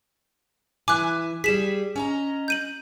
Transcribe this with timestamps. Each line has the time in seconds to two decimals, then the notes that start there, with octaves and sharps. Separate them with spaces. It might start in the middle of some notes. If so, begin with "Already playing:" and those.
0.88 E3 E4 G#5 D6 F#6
1.44 G3 G#4 B6 E7
1.96 C#4 D#5 A#5
2.48 G6 D#7 F#7